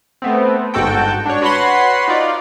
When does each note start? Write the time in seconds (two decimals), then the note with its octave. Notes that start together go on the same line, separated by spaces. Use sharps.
0.22 A3 B3 C4
0.74 G1 G#2 F#4 A4 G5
1.26 D4 C#5
1.42 F#4 B4 C#5 F#5 B5 C6
2.08 D#4 F4 D5